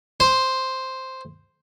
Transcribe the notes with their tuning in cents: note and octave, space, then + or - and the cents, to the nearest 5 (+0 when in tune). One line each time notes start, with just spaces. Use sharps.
C5 +0